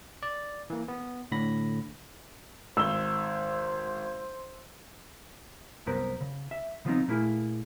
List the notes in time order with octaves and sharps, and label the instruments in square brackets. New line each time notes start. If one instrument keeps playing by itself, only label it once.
[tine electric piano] D5
E3 A#3
B3
A2 D3 B5 A#6
[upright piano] G#1 G7 [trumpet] C5 [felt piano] E6
[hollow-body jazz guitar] C2 F#2 B3 A#4 C5
C#3
E5
C#3 F3 B3 C4 D#4
A#2 A3 A#3 E4 G#4